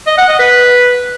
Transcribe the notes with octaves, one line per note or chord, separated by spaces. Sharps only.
D#5
F#5
D#5
B4